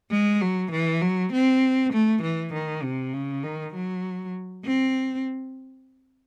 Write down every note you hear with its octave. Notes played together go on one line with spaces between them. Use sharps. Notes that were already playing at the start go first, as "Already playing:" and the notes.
G#3
F#3
E3
F#3
C4
A3
E3
D#3
C3
C#3
D#3
F#3
C4